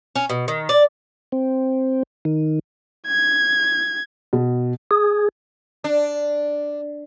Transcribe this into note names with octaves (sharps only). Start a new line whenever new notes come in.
C#4
B2
D#3
D5
C4
D#3
G#6
B2
G#4
D4